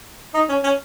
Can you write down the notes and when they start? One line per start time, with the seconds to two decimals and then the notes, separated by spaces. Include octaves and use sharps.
0.34 D#4
0.49 C#4
0.64 C#4